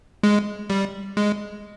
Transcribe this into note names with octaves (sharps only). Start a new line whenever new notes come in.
G#3
G3
G#3